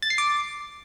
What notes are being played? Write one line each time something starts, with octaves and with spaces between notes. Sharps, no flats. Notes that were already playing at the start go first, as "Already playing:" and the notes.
A6
C7
D6